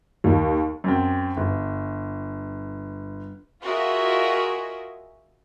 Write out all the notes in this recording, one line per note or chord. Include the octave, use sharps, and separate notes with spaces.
D#2
F#2 C4
G1
F4 F#4 G#4 A#4 D#5 E5